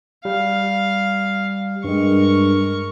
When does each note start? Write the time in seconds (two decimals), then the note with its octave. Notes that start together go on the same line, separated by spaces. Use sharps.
0.25 G3 F5
1.84 G2 G#3 A#4 C#6